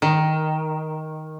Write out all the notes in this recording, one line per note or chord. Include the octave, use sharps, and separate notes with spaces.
D#3